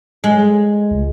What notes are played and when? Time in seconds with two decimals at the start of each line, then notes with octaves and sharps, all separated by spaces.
0.24 G#3
0.91 C#2